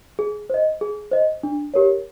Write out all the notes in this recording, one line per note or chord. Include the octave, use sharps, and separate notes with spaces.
G#4
C5 D#5
G#4
C5 D#5
D4
G4 A#4 C#5